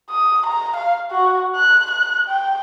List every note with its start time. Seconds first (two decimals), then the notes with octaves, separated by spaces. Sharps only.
0.11 D#6
0.46 A#5
0.76 F5
1.11 F#4
1.56 F#6
1.91 F#6
2.28 G5